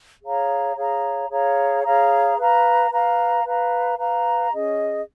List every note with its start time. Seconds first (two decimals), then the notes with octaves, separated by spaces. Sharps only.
0.22 G#4 C#5 F5 A#5
0.76 G#4 C#5 F5 A#5
1.30 G#4 C#5 F5 A#5
1.84 G#4 C#5 F5 A#5
2.37 B4 F5 A#5
2.90 B4 F5 A#5
3.44 B4 F5 A#5
3.98 B4 F5 A#5
4.52 C#4 G#4 D#5